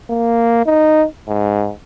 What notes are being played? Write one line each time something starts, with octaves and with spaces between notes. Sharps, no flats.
A#3
D#4
G#2